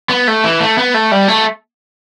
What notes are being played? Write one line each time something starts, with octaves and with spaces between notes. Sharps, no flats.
B3
A3
E3
A3
B3
A3
G3
A3